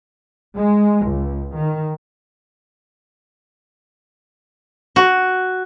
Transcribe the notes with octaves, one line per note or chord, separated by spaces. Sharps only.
G#3
C#2
D#3
F#4